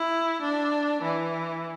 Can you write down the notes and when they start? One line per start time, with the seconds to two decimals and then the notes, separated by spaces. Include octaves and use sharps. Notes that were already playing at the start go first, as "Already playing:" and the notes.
Already playing: E4
0.42 D4
1.02 E3